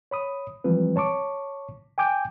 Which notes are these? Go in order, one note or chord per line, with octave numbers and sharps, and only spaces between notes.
C#5 B5 D#6
E3 F3 G3 G#3 C4 B4
C#5 A5 C#6 D6
G5 G#5 D6 G6